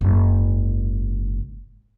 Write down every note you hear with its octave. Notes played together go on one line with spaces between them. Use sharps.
F#1 G#2